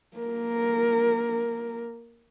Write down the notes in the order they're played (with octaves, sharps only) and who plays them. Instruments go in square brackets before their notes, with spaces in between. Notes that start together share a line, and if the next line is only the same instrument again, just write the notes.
[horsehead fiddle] A#3 A#4